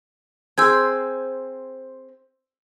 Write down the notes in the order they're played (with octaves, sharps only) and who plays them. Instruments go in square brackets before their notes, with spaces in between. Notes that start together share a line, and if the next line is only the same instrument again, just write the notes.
[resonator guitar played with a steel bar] C4 G#4 C5 [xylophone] E6 G6 G#6